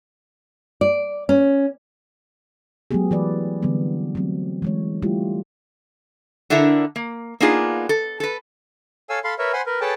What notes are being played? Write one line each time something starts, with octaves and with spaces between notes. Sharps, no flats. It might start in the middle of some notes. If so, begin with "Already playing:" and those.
D5
C#4
F#3 G#3 A3 B3 G4 G#4
E3 B4 D5
D3 E3 F#3 G3 B3 C4
F#3 A3 C4
E3 G#3 C#5
G3 A3 E4 F4 G4
D3 D4 E4 A4 A#4
A#3
A#3 B3 D4 D#4 F4 G#4
A4
A4 B4
A4 C#5 F5 G#5 E6
A4 F5 B5 C6
A#4 B4 C#5 E5
C5 F#5 G#5 B5 C6
A#4 B4
G#4 A4 B4 C#5 G5 A5